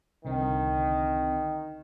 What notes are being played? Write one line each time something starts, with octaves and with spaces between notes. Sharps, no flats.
C2 D3 D#3 C4